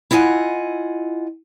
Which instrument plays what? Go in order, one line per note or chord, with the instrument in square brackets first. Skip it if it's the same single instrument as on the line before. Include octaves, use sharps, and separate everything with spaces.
[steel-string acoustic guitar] E4 F4 D#5 F#5 G#5